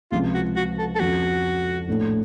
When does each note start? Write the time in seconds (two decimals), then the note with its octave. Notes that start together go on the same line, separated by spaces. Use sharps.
0.12 C#2 C3 F3 F4
0.34 F#4
0.56 F#4
0.78 A4
0.96 A4
1.00 F2 C#3 F3 F#4
1.88 A#1 A2 A3